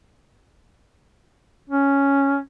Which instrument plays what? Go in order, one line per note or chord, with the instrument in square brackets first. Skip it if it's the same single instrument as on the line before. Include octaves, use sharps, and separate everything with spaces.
[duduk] C#4